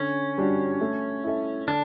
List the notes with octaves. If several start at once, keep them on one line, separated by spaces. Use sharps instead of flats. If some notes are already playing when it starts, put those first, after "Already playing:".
Already playing: D3 C#4
G3 D4 F#4
A3
E4 A4 E5
D3 D4